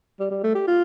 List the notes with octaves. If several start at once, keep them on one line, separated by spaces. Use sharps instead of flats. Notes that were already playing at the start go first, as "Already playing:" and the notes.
G3
G3
A3
G4
F4